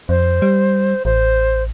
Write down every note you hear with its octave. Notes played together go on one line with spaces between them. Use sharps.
F2 C5
G3
A1 C5